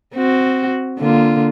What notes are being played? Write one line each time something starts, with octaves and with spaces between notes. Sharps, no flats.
C4 F#4
D3 A#3 F4